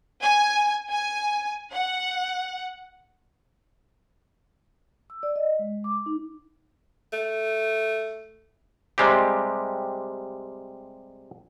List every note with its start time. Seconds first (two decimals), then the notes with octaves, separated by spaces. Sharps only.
0.22 G#5
0.91 G#5
1.72 F#5
5.10 E6
5.23 D5
5.36 D#5
5.59 G#3
5.84 D6
6.06 D#4
7.13 A3
8.98 C3 G3 G#3 C4 G4